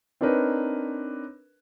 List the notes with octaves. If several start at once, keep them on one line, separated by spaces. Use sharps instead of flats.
C4 D4 D#4 A#4 B4 C#5